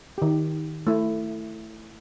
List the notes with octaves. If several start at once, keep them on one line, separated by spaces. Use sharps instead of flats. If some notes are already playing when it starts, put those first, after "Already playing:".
D#3 G4
A3 E4